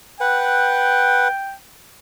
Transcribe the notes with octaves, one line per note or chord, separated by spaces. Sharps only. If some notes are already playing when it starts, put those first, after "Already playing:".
B4 F#5 G5